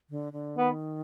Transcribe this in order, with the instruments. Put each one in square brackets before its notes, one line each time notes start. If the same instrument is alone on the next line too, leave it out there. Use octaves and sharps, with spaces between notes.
[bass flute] D3
D3
[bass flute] D#3 [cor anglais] B3